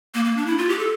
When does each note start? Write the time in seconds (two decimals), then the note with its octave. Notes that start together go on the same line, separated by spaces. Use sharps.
0.14 A#3
0.25 A#3
0.37 D4
0.46 E4
0.58 F4
0.69 G4
0.79 A4